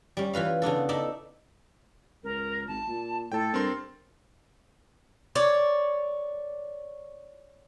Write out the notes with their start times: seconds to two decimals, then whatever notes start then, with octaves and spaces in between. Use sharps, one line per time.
0.17 G3 C#4
0.33 E3 F4 B4 F5
0.62 C#3 B3 D4 A4
0.89 D#4 A4 D5 E5
2.24 C#2 A#4
2.68 G#1 A5
2.88 A#2
3.32 A2 A4 G5 A5
3.54 G2 C4 A#4 C6
5.35 C#5 D5